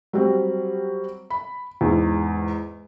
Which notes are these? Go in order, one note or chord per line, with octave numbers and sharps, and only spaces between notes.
F#3 G3 C4
B5
E2 G#2